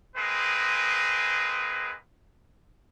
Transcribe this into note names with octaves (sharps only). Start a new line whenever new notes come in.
G#3 A#3 C4 G#4 B4